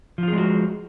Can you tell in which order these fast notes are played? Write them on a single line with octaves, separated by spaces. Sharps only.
F3 F4 G#4 G#3 F#4